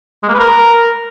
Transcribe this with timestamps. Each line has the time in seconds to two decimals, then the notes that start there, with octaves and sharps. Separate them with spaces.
0.23 G#3
0.28 A#3
0.34 B4
0.40 A#4